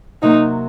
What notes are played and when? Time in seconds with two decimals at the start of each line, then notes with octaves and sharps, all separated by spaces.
0.22 C3 F#3 A#3 D#4